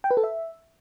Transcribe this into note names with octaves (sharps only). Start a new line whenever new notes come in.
G5
B4
A4
E5